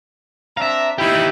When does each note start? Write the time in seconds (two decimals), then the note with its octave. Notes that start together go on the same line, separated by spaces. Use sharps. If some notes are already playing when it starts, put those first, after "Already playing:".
0.57 C4 D4 E5 F5 A#5
0.98 D#4 E4 G4